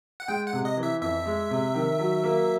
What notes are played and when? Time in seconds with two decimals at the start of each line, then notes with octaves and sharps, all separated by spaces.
0.20 F#5
0.28 G#3 G5
0.47 F#5
0.53 C3
0.65 D#5
0.77 E3
0.83 E5
1.01 F2 E5
1.26 G#3
1.51 C3
1.75 D#3
1.99 F#3
2.24 A#3